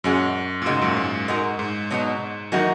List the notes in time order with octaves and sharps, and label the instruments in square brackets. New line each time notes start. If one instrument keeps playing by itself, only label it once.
[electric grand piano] F#2 [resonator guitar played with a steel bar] A#2 G#3 C#4 F#4
[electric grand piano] A#2
[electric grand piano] G#2 [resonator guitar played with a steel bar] C#3 G#3 D#4 F#4
[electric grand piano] F#2 A#2
G#2
[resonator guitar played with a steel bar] G#3 D#4 F#4 A#4
[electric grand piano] G#2
[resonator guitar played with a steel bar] B2 F#3 B3 D#4
[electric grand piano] D#3 F#3 [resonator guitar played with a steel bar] E3 A#3 D#4 F#4 A#4